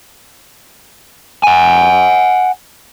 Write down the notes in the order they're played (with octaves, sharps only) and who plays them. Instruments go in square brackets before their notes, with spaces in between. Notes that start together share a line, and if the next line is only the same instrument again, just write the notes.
[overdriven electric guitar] F#5 G#5